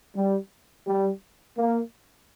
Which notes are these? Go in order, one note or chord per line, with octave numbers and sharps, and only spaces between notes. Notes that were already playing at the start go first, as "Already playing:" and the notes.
G3
G3
A#3